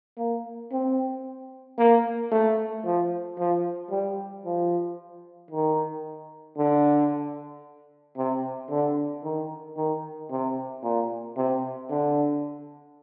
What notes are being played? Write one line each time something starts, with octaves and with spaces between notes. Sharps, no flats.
A#3
C4
A#3
A3
F3
F3
G3
F3
D#3
D3
C3
D3
D#3
D#3
C3
A#2
C3
D3